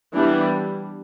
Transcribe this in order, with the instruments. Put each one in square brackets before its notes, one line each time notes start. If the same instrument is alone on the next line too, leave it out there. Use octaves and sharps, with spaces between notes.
[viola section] E3 G3 B3 D4